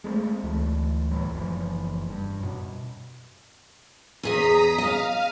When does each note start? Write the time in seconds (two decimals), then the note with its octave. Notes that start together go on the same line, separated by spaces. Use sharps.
0.04 G#3 A3 B3 C4
0.43 D2 E3 G#3 A3
1.11 C2 A2 E3 F#3
1.34 F#1 E3 F3
2.10 G2
2.40 F#2 B2
4.23 E2 G#4 D#5 A#5 D#6 B6
4.78 D#5 F5